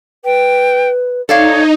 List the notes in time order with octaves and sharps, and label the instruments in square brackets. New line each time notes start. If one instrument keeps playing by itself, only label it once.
[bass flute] B4 [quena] G5
[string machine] D#4 [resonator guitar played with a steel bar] A4 D5 F5 [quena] C#5